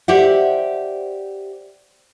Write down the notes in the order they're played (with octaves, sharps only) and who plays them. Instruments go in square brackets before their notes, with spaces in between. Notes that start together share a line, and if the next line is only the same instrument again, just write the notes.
[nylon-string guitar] G4 C5 D5 E5 F#5